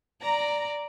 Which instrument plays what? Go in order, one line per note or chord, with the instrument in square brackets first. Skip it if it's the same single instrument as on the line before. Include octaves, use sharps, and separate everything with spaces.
[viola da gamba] D5 [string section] A#5